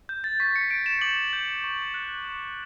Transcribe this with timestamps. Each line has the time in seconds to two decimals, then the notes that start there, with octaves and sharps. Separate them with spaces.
0.09 G6
0.24 A6
0.40 C#6 B6
0.56 C#7
0.70 G6 D7
0.86 E7
1.01 D6 F#7
1.33 G6
1.64 C#6
1.94 F#6
2.25 D6